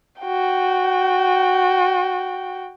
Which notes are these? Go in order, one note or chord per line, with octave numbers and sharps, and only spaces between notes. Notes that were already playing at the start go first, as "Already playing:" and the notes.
F#4 G5